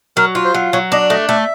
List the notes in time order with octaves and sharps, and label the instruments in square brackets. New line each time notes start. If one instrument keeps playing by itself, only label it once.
[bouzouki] F#3 [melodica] A#4
[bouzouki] F4
[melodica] C5
[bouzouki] F#3
[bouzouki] F#3 [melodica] C#5
[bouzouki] D4 [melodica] D#5
[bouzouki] A3 [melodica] D#5
[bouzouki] A3 [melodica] E5